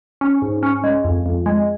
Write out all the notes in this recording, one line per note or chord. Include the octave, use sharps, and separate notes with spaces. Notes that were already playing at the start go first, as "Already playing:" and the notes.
C#4
G#2
C#4
G#3
F2
F2
G#3